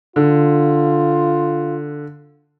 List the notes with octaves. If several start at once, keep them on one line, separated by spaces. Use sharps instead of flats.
D3 F4